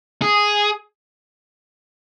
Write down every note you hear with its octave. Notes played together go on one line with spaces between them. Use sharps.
G#4